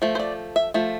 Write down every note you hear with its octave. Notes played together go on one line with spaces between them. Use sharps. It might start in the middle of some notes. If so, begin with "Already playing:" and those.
F3 A3
C5
D5
E5
F3 A3